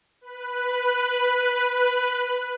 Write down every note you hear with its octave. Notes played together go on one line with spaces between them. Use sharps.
B4 B5 F#6